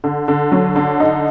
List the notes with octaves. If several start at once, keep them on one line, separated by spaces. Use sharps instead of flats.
D3
D3
F#3
D3
D#4